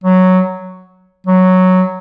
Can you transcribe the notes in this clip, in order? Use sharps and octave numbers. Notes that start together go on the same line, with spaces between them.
F#3
F#3